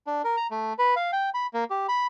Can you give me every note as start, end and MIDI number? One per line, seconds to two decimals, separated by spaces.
0.07 0.22 62
0.24 0.36 70
0.37 0.47 82
0.51 0.73 57
0.79 0.94 71
0.96 1.11 77
1.12 1.30 79
1.34 1.47 83
1.54 1.64 58
1.70 1.87 67
1.88 2.07 83